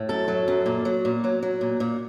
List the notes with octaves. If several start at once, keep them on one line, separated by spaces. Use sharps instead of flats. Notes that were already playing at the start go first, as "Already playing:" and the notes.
Already playing: A2
F#2 A4
F#3
F#2
A#2
F#3
A#2
F#3
F#3
A#2
A#2